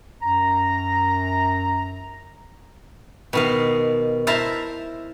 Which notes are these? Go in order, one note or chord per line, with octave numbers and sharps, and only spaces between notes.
F#2 A#5
B2 D#3 F5
E4 C5 E5 F5 A5 A#5